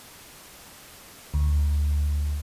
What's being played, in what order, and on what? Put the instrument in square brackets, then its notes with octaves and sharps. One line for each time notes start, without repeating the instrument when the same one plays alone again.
[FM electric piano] D2